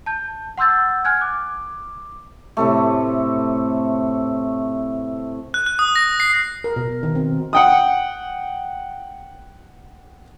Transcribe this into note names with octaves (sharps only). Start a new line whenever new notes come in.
A5 G6
F#5 C6 E6 G6 A6
G#5 F6 F#6 G#6
D6
A2 C3 A3
F#6
F#6
D#6
A#6
C7
A#4
B2
D#3
C4
F#5 G5 D#6